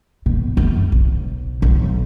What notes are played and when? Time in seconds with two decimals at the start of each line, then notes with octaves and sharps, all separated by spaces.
0.26 B2
0.57 F#2
0.92 B1
1.62 B1